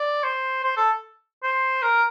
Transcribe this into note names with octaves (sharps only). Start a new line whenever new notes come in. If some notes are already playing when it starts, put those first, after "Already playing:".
Already playing: D5
C5
C5
A4
C5
A#4